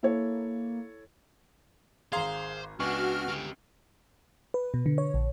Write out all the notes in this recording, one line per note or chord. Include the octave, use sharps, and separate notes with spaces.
A#3 E4 A4 C#5
G#1 G#4 C5 F5 A#5 C6 G#6
C#2 B3 D4 F#4 G#5 C#6 F6
D3 G4
B4
B2
D3
C#5
A#1